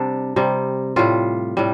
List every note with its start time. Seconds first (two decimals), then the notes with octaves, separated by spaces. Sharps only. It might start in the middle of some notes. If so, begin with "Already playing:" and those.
Already playing: C3 G3 D4
0.36 C3 G3
0.96 A2 G3 F4
1.57 A2 G3